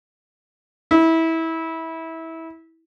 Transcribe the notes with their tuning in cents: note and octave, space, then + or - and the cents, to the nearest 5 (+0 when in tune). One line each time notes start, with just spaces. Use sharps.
E4 -20